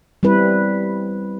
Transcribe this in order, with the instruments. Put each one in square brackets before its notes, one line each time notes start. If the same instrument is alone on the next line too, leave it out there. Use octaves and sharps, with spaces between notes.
[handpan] G3 C4 E4 B4